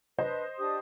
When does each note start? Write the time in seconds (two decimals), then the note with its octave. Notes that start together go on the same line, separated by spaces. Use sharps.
0.18 D4 B4 C5 D#5
0.57 D4 G4 D#6